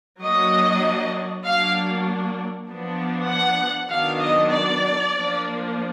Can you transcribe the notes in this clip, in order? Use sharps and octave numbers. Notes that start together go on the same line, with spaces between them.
F#3 A#3 D4 D#5
F#3 A#3 D4 F5
F3 B3 D4
F#5
D#3 F#3 B3 D4 F5
D#5
D5
F3 A#3 D4